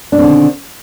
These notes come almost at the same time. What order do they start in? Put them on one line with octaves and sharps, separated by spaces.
D4 B2 C4 D3 D#3